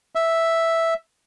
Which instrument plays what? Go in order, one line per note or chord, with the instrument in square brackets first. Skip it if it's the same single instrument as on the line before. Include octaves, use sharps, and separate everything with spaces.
[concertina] E5